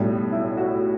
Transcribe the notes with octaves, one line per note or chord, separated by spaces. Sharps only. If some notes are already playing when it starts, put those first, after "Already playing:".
Already playing: B1 A2 G3
E4
F#4